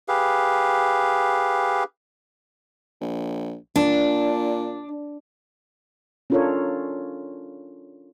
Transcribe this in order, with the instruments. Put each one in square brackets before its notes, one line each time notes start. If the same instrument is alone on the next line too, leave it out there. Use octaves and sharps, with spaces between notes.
[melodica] G4 G#4 B4 F5
[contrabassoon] A#1
[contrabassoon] A#2 [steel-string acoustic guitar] D4
[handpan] C#4 D4 F4 A4 A#4 C#5